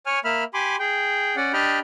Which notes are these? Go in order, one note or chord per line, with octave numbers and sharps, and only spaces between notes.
C#5 G#5 F6
A#3 E5 B5 F6
G4 G#5 B5 C6 D6
G#4 G5
C#4 D5 F#5
D4 G4 D#5 G5 B5 F6